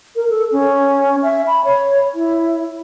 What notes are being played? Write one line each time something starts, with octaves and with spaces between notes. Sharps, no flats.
A#4
A4
C#4
E5
B5
C#5
E4